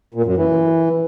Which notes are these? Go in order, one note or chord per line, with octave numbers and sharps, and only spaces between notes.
A#2
F#2
E3